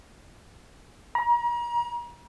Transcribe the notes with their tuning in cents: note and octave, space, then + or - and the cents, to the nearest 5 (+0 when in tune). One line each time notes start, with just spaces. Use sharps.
A#5 +35